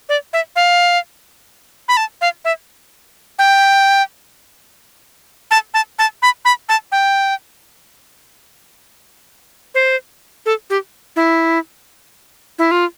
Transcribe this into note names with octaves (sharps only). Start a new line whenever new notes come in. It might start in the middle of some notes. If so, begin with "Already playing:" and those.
D5
E5
F5
B5
A5
F5
E5
G5
A5
A5
A5
B5
B5
A5
G5
C5
A4
G4
E4
E4
F4